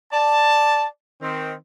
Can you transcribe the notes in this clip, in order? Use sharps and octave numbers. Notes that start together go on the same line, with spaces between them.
D5 A5
D#3 C4